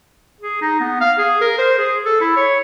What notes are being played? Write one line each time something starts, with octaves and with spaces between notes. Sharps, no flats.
G#4
D#4
B3
F5
G#4
A#4
C5
G#4
A4
E4
C#5